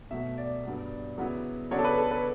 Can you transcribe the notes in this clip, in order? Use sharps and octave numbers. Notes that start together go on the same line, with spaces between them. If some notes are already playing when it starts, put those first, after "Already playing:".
B2 F#3 A3 E5
D5
G2 F#3 B3 D4
C#3 F#3 B3 E4
C#3 F#3 B3 D4 C#5
A4
B4
A4
B4